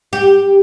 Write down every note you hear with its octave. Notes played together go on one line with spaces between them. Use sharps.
G4